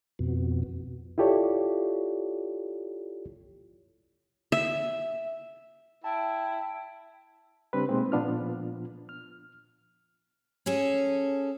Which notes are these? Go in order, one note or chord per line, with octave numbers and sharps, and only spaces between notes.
F2 B2
E4 F4 G4 A4 C#5 D5
E5
E4 G5 A5
C#3 G3 C4 D4 B4
B2 G#3 A#3 C4 D#4
A#2 F3 B3 D4 F4 F6
F6
C#4 G#4 A4